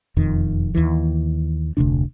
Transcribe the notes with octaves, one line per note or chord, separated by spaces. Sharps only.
E1 F2 D#3
D#2 E3
F1 D2 C3 D4